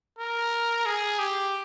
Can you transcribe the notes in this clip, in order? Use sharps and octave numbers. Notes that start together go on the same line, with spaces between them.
A#4
G#4
G4